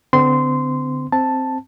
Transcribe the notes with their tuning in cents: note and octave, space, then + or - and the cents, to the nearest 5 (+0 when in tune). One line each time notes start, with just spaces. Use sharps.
D3 -10 C4 -40 C6 -15
C4 +0 A5 +0